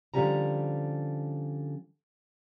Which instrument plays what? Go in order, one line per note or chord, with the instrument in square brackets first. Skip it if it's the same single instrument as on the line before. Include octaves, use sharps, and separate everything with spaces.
[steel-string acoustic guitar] D3 F3 G3 C#4 A#5